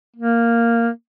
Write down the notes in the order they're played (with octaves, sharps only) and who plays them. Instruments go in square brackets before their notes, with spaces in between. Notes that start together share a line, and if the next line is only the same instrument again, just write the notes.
[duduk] A#3